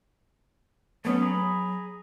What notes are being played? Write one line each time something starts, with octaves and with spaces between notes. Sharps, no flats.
F#3 A3 B3 C#4
G#4 A#5 B5